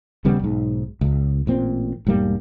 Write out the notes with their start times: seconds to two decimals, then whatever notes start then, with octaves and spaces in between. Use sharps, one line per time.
0.25 D#1 C#3 G3 B3
0.40 B1 G#2
1.01 C#2
1.47 A1 A#2 C4
2.07 E1 G#2 G3 A#3